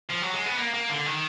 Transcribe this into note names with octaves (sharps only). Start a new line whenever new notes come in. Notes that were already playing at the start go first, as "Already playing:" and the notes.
F3
F#3
G#3
B3
A#3
A#3
D3
D#3